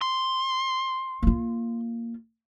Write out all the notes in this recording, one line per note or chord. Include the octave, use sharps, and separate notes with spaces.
C6
A#3 F4